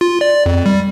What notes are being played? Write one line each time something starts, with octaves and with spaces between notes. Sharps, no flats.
F4
D5
F2
G3